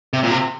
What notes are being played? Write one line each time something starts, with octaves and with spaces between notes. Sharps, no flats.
C3
A#2
C3